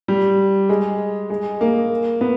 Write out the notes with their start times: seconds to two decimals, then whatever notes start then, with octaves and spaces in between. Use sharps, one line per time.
0.08 G3
0.69 G#3
1.30 G#3
1.61 A#3
2.21 B3